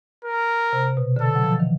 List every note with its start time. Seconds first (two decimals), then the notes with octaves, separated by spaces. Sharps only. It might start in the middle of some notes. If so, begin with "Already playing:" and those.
0.25 A#4
0.73 C3
0.97 B2
1.16 D3
1.21 C#3 A4
1.35 F#3
1.43 F3
1.52 E3
1.60 D#3